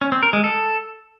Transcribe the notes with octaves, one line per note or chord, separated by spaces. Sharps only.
C#4
C4
A#4
G#3
A4